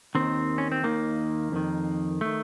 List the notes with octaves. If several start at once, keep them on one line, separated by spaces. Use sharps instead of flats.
D#2 D#3 C4
C#4
C4
D#2 D#3 A#3
F2 D#3
D#3 A3